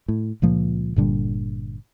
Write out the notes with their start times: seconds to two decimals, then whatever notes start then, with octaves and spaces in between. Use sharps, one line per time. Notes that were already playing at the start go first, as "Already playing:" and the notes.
0.08 A2
0.42 C#2 A#2 F3 A#3
0.96 G1 A#2 D3 G3